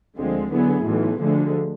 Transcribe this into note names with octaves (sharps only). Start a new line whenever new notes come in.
D2 D3 F3 G#3 C4
D3 F#3 B3 E4 G#4
B1 A2 E3
D2 D3 F3 G#3